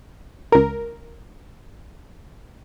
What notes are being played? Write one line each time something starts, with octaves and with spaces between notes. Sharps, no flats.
C#2 A#4